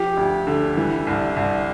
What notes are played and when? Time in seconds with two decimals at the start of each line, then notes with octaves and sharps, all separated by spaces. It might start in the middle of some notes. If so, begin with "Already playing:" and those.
Already playing: F3 G4
0.17 D2
0.47 D3
0.77 E3
1.07 C2
1.37 C2